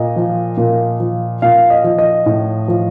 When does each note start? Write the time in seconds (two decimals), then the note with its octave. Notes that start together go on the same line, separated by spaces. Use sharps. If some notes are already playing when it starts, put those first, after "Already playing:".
Already playing: A#2 D#5
0.16 F3
0.57 A#2
1.00 F3
1.42 A#2 F5
1.70 D#5
1.84 F3
1.98 D#5
2.26 A2
2.68 F3